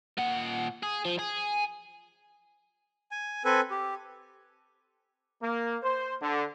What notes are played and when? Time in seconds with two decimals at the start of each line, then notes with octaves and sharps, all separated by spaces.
0.17 A#2 F#5
0.83 G#4
1.05 F3
1.19 G#4
3.11 G#5
3.45 C4 A4 B4 G#5
3.71 G4
5.42 A#3
5.83 C5
6.22 D3